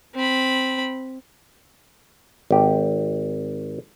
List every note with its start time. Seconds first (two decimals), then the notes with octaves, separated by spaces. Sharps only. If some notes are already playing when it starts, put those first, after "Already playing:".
0.15 C4 B5
2.51 G#1 G4